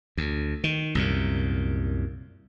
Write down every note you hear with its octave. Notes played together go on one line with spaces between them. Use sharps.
D2
D#3
C2 F#2 A#2